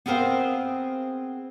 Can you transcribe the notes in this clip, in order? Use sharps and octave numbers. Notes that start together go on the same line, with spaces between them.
B3 C4 G#4 A#4 C5 F5